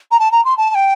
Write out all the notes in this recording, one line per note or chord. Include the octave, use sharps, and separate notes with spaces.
A#5
A5
A#5
C6
A5
A5
G5